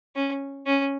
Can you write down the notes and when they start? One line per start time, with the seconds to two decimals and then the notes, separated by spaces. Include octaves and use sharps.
0.16 C#4
0.67 C#4